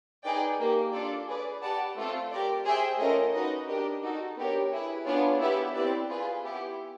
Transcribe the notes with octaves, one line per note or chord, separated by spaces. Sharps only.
D#4 G#4 B4 D5 G5
A#3 D#4 G4
D4 F4 A4 D5
G#4 B4 D5
G4 B4 D5 F#5 A5
A3 C4 F4 A4
G4 A#4 D5
G#4 C5 E5 G5
A3 C#4 F4 A#4 D#5
D#4 F#4 B4 D#5
D4 G4 A#4 D#5
D#4 F#4 A4
B3 D4 G4 A#4 C#5
E4 G#4 B4
B3 D4 F4 G#4 C#5
B3 E4 G4 B4 E5
C4 E4 G4 B4 D5
F4 G#4 B4
B3 E4 G4